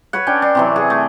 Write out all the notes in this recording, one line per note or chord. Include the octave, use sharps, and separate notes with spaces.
F#4 B4 C#5 F#5
C#4 D4 G5
D4
C3 E3 F#3
G#4 F#5
A3